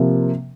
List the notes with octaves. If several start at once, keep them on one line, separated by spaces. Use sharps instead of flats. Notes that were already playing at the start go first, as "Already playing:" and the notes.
Already playing: C3 F3 A#3